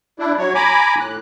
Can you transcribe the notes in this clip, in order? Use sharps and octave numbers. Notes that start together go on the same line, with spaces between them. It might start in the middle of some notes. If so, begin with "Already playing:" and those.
D4 E4
F#3 C#5
G#5 A#5 B5 D6
A2 F#6